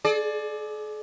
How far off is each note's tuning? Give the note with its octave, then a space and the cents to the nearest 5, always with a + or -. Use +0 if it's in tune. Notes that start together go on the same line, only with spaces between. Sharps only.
G#4 +45 D5 +15